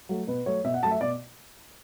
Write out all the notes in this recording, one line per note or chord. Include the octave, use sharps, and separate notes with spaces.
F#3 A3
B2 B4
F#3 A3 C#5
B2 E5
F#5
F#3 A3 A5
E5
B2 D5